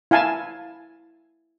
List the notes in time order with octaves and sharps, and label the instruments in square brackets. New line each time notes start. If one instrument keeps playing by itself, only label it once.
[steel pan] E4 F5 G#5 A5